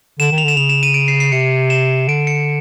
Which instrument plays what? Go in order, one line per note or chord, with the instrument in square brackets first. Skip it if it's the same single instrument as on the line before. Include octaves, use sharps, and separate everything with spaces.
[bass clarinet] D3 [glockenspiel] E7
[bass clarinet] D#3
[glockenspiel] F7
[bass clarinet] D3 [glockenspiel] E7
[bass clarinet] C#3 [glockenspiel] F7
[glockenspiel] E7
D#7
D7
C7
C7
[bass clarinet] C3 [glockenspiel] C#7
[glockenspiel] E7
[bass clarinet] D3 [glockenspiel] D7
[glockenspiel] C#7